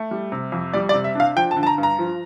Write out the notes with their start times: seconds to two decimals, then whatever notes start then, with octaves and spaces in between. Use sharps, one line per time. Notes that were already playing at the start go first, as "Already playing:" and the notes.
Already playing: A3
0.11 G3
0.32 C3
0.52 F2
0.73 G3 D5
0.89 D5
0.94 C3
1.04 E5
1.15 D4 F5
1.36 F3 G5
1.51 A5
1.56 D3
1.63 A5
1.67 A#5
1.78 G2
1.83 A#5
1.99 F3